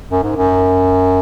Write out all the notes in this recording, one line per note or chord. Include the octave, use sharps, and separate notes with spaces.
F#2
G#2
F#2